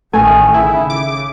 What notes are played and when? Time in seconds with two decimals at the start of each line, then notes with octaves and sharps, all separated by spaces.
0.13 A1 D#3 A3 G#5
0.54 C#3 E4
0.90 D6